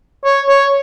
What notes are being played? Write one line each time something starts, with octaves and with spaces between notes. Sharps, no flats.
C#5
C#5